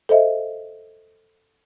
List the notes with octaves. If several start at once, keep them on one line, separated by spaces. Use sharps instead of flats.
A4 C5 D#5 E5